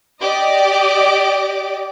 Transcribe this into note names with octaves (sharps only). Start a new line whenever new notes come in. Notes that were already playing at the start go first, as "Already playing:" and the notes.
G4 D5 D#5 D6